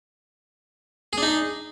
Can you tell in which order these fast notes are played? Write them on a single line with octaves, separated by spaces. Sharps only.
G#4 D4 D#4